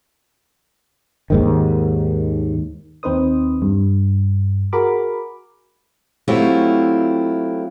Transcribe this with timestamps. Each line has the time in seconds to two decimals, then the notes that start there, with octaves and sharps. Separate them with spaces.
1.30 D#2 G#2 D#3
3.03 D#2 C4 D#4 B4 C5 D#6
3.62 G2
4.73 F#4 G#4 A#4 B5 D6
6.28 F#3 A3 C4 E4 F4 G4